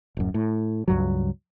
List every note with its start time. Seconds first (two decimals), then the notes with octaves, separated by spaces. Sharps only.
0.17 D1 F#2
0.34 A2
0.88 C#2 G2 F#3